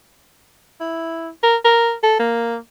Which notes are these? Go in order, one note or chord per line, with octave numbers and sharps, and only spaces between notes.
E4
A#4
A#4
A4
A#3